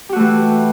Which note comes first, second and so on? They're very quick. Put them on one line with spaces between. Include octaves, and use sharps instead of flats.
G4 F#4 A3 E3